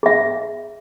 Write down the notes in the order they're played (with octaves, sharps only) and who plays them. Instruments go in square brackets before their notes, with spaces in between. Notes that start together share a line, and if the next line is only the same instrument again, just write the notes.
[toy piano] G#4 E5